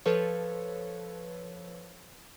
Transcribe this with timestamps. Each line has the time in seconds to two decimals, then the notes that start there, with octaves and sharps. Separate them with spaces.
0.06 F3 A4 B4 C#5